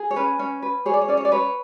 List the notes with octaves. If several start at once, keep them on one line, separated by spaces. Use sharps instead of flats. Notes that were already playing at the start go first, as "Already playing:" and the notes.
Already playing: G#4
C#5
C#4 B4
C#4
B4
G#4 C#5
D5
C#5
C#4 D5
C#5
D5
B4 C#5